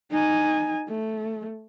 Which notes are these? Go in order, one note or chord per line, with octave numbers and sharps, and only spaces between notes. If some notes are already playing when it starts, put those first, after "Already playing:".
D#4 G#5
A3